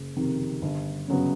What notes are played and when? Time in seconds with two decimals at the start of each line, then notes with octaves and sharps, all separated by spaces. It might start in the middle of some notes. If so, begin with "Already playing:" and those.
Already playing: F#1
0.16 F2 C3 D#3
0.62 G1
1.08 F#2 C#3 F#3 B3